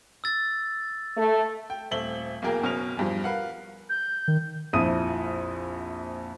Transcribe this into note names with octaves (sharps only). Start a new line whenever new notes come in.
E6 A6
A3
G5
D#1 A3 C4 E5 F#7 G7
B1 E2 A#3 G#4 A#4 G5
F#1 B2 C#4 A#4 F6 F7
E2 G2 F3
A#4 B4 F5 F#5
G6
D#3
A#1 F2 E4 D#6 D#7